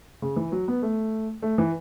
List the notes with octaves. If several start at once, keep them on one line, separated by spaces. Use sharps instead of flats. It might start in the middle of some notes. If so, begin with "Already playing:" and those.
C#3
E3
F#3
B3
A3
A3
E3